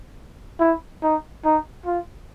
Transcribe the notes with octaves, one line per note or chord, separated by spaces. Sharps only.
E4
D#4
D#4
F4